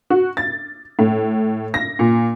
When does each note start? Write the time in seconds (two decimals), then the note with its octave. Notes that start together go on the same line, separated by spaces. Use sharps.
0.10 F#4
0.37 A6
0.99 A2
1.74 A#6
1.99 A#2